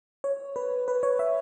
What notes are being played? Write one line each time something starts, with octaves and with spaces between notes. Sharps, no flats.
C#5
B4
B4
C#5
E5